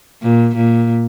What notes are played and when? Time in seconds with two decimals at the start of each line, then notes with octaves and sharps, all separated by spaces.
0.22 A#2
0.55 A#2